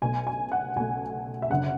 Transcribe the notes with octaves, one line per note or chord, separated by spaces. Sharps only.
B1 B2 A3 G#5
G#5
F#5
B1 B2 A3 G#5
E5
F#1 F#2 D3 F#5